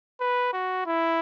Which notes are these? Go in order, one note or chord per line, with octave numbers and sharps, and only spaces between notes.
B4
F#4
E4